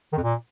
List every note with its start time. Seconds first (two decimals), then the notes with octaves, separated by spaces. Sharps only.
0.12 D#3
0.17 F2
0.22 A#2